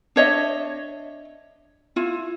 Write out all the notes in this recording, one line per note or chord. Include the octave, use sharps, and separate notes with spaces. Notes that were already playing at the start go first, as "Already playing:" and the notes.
D4 C#5 D#5 E5
E4 F4